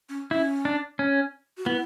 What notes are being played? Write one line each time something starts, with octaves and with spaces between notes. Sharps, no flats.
C#4
C#4 E4
D4
C#4
F#4
B3 E4